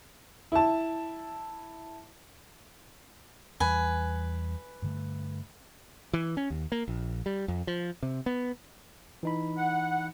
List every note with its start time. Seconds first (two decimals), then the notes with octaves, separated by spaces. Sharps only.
0.52 E4 A5
3.60 E2 E3 G3 B4 G#5
4.82 G2 D3 A3
6.13 E3
6.37 C#4
6.50 D#2
6.72 A#3
6.88 A#1
7.26 G3
7.48 F2
7.67 F3
8.03 C3
8.26 B3
9.23 E3 D#4 B5
9.57 F#5